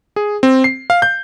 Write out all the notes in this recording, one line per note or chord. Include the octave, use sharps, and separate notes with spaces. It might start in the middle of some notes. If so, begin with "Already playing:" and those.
G#4
C4
C7
F5
G6